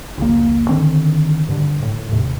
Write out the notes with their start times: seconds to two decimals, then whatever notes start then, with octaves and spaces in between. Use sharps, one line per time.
0.18 F1 C#2 C3 A#3
0.69 D3 D#3 C4
1.48 G2 D3
1.82 A2
2.11 D#2 A2 C3